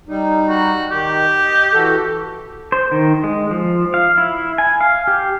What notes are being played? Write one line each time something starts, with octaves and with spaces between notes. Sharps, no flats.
G3 D#4
F#4
D#3 G4
D#5
E3 F#4 A4
C5
D#3
G#3
F3
F5
E4
G#5
F5
G4